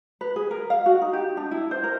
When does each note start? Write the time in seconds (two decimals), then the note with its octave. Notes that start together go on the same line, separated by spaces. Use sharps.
0.21 B4
0.36 G#4
0.51 A#4
0.70 F5
0.86 F#4
1.02 D#4
1.13 G4
1.37 D4
1.51 E4
1.71 C5
1.84 A#4